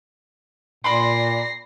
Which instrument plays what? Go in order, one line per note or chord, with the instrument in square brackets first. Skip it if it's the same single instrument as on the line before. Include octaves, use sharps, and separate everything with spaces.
[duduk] A#2 [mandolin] D5 B5 C6 [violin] A#6 C7